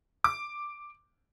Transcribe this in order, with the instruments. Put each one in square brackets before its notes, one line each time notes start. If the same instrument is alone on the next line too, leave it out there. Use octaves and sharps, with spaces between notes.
[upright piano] D6